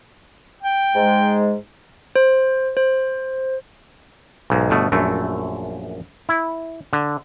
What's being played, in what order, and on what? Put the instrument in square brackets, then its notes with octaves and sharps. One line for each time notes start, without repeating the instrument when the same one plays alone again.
[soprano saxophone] G5
[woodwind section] G#2 G#3
[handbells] C5
C5
[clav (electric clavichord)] B1 G#2
G1 B2 A3
A#1 F#2 A3
E4
D3